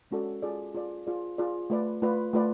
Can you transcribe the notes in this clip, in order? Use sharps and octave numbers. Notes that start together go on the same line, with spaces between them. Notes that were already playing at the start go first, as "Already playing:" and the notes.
G#3 C#4 F#4 A4 D5
F4 G#4 D5
F4 G#4 D5
F4 G#4 D5
F4 G#4 D5
A3 F4 B4 D5
A3 F4 B4 D5
A3 F4 B4 D5